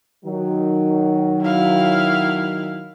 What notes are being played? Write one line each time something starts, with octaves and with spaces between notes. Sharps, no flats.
D#3 F#3
E4 F5